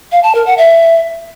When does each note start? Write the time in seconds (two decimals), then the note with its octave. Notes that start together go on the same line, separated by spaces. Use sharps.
0.12 F5
0.23 A5
0.35 A#4
0.46 F#5
0.58 E5